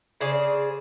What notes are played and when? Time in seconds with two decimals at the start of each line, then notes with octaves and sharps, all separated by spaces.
0.21 C#3 G#4 C5 D5